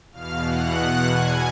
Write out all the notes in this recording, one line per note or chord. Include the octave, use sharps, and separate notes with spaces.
E2 B2 F5 F6
F#5 F#6
G#5 G#6